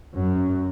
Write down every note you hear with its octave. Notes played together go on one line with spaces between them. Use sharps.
F#2